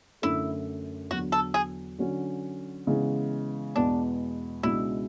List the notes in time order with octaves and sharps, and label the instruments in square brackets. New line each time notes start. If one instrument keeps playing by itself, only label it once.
[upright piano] F#2 D3 A3 [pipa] E4
[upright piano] E2 D3 F#3 [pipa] F#4
[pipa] A4
G#4
[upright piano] D3 F#3 C#4 F#4
C#3 E3 G#3 B3
[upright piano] E2 B2 G#3 B3 [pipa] D4
[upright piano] C#2 B2 G#3 D4 F#4 [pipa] E4